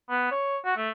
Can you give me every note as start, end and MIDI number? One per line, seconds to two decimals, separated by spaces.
0.10 0.27 59
0.31 0.57 73
0.65 0.76 66
0.76 0.90 57